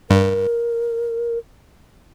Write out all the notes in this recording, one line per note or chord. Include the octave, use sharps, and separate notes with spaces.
G2 A#4